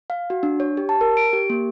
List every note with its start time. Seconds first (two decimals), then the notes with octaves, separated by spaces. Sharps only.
0.10 F5
0.30 F#4
0.43 D4
0.60 C#5
0.77 G4
0.89 A5
1.01 A#4
1.17 D7
1.33 G4
1.50 A#3